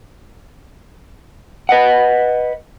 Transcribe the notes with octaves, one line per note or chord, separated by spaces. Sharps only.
B4 D#5 F#5